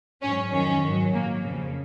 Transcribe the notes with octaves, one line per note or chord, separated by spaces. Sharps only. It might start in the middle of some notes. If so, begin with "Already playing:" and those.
G#2 F#3 C#4
F2 D#3 F#3 C#4
G#2 D#3 F#3
A#2 F#3 A#3
F2 C#3 F3